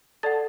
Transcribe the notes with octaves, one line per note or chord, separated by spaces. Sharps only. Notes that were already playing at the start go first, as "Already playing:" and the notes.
A4 D5 F#5 A5 A6